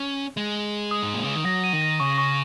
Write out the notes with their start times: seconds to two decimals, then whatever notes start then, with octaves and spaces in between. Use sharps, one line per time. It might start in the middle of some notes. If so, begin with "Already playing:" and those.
Already playing: C#4
0.37 G#3
0.91 D#6
1.03 G#2
1.14 A#2
1.24 C#3
1.35 D#3
1.45 F#3 A#6
1.64 D#7
1.73 D#3
1.82 A#6
2.00 C#3 C#6
2.18 C#6